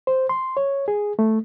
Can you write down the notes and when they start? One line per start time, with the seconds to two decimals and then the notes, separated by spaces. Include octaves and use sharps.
0.07 C5
0.29 C6
0.57 C#5
0.88 G#4
1.19 A3